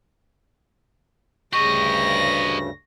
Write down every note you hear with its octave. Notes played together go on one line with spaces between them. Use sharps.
D2 G2 C#3 G4 D#5 C#6 A#6